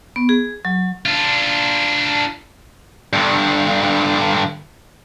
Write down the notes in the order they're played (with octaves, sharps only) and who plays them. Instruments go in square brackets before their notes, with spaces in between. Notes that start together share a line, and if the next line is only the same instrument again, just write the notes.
[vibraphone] B3
G#4
F#3
[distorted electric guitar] D4 F4
G2 D3